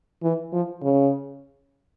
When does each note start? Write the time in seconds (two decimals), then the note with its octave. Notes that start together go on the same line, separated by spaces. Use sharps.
0.23 E3
0.53 F3
0.82 C#3